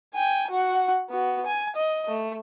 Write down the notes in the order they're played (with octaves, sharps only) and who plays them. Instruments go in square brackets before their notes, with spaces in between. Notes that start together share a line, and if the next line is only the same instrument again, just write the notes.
[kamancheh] G5 G#5
F#4 F#5
B3 F#4
G#5
D#5
A3